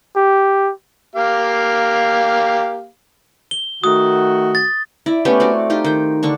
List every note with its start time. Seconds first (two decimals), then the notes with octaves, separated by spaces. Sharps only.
0.16 G4
1.15 A#3 G4 F5
3.51 G7
3.84 D#3 A3 F#4 D#6
4.55 A6
5.06 E4 D5
5.25 A3 B3 C#4 G4
5.40 A3 C4 F#4 D5
5.70 D#4 F4 G4
5.84 D#3 G5
6.23 D3 D4 C#6